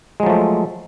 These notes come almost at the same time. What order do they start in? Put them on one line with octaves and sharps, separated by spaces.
G#3 F#3 F3 A3